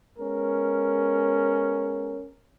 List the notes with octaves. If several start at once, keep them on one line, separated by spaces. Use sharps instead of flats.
G#3 B3 C#4 A#4